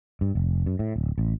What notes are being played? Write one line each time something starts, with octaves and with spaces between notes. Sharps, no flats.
G2
F1
F#2
A2
D1
A1